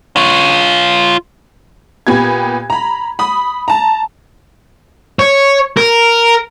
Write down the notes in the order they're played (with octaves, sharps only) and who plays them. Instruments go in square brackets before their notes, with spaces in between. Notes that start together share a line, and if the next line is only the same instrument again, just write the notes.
[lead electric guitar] F4 C#5
[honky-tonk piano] A#2 B3 G4 G#6
A#5 B5
B5 D#6
A5 A#5
[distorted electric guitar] C#5
A#4